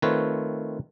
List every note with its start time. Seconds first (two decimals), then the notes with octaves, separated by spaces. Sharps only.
0.02 D#3 A3 C4 F4 B4 C#5